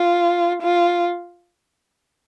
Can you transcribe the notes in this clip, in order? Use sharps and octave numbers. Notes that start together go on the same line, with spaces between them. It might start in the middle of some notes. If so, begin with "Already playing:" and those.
Already playing: F4
F4